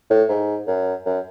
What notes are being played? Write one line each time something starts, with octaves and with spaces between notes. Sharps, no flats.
A2
G#2
F#2
F#2